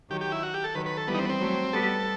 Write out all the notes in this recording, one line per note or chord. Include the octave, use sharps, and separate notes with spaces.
D#3 F#3 G4
G4
E4
F#4
G4
A4
D#3 F#3 B4
B4
A4
E3 G3 B3
D#4
C4
B3
C4
F#3 A3
G3 B3 A4